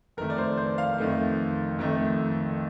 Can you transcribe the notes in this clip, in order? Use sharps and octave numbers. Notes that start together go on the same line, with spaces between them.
F2 D#3 A3 A#4
D5
C5
C5
F5
F2 D#3 A3
F2 D#3 A3